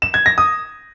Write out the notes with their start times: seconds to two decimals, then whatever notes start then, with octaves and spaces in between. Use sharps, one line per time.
0.02 E7
0.14 G#6
0.26 A#6
0.38 D#6